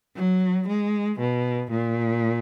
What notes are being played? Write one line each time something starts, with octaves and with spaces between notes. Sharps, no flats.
F#3
G#3
B2
A#2